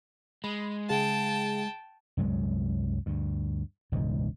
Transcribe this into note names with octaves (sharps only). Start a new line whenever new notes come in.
G#3 B5
C#3 G#4 F5 G5 A5
C2 F#2 F#3 G#3
D2 G2
E1 C#2 G#2